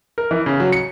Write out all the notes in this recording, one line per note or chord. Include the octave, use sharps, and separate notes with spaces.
A#4
E3
C#3
F#3
C#7